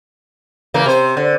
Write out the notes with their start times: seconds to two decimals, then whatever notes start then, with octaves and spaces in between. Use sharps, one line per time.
0.74 C#3 E3 A#3
0.86 C3 C5
1.17 D3